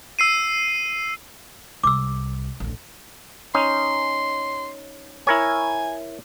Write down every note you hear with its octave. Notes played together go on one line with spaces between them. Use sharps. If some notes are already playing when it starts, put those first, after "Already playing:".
E6 C7 D#7
C2 D6 E6
A1 D2
C#4 D#4 C6
E4 A#4 C#5 G#5